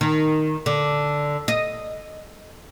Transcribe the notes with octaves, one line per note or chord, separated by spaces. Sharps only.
D#3
D3
D#5